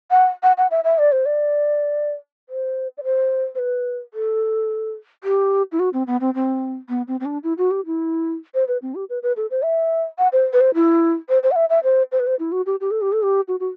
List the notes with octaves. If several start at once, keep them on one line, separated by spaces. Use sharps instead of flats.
F#5
F#5
F#5
E5
E5
D5
C5
D5
C5
D5
C5
C5
B4
A4
G4
E4
F#4
C4
B3
C4
C4
B3
C4
C4
D4
E4
F#4
G4
E4
C5
B4
C4
G4
B4
B4
A4
C5
E5
F#5
C5
B4
C5
E4
C5
C5
F#5
E5
E5
C5
C5
B4
C5
E4
F#4
G4
G4
A4
G4
A4
G4
F#4
F#4